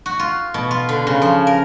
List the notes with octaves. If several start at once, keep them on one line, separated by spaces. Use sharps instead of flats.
F#4
F4
B2
F4
D3
C#3
F3
A#4